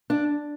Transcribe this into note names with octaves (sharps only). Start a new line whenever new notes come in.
D4